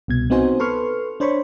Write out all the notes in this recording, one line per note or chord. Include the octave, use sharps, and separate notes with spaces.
C2 B2 G#6
B3 C4 D#4 F#4 C5 G#5
A4 B4 C6 C#6 F6
D4 C5 C#5 B5 C#6